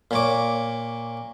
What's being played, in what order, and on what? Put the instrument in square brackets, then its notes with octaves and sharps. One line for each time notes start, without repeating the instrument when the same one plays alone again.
[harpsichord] A#2 C#5 D6